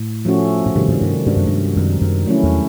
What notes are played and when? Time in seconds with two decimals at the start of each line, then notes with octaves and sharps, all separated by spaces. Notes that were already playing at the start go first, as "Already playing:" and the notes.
Already playing: A2
0.25 F3 A3 C#4 F#4
0.66 A2
0.75 G#2 C3 D#3 G3
0.88 G2
1.01 G2
1.26 G2 G#3 B3 D4 F#4
1.36 F#2
1.46 G2
1.76 F#2 D#3 G3 C4 D#4
2.01 F#2
2.26 F#3 A3 C#4 E4
2.43 E2